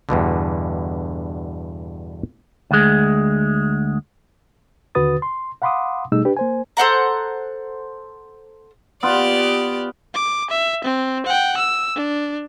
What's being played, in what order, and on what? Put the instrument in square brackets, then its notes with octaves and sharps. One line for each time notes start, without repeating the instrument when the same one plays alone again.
[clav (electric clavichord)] E2 G2 B2 D3
[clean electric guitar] D2 G#3
[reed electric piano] D#2 D3 F#4 B4 D#6 A6
C6
F5 F#5 B5 C6 D6 D#6
B2 G3 A3 D#4 G#4 E6
D4 G4 B4
A#3 C5 G#5
[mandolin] A4 C5 F#5 A#5
[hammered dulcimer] B3 F4 [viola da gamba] G4 D5
[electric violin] D6
E5
C4
F#5 G5
E6
D4